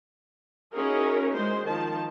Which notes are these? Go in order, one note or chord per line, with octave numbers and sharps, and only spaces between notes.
C#4 D#4 E4 F#4 G#4 A#4
G#3 C5
D#3 F3 A5